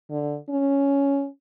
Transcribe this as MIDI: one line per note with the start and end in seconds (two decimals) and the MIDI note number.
0.10 0.37 50
0.49 1.27 61